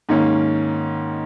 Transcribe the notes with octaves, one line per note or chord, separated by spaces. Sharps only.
G#2 D#3 A#3 C#4